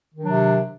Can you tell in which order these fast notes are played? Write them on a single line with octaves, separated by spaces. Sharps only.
D#3 D4 F#3 C3